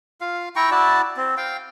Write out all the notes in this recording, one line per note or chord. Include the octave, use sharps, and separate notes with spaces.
F4 F5
E4 G5 A#5 C#6
E4 F#4 D5 A5
C4
F5 G5